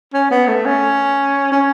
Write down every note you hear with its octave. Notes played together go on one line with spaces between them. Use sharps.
C#4
B3
A3
C#4
C#4